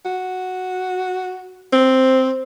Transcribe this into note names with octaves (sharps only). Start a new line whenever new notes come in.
F#4
C4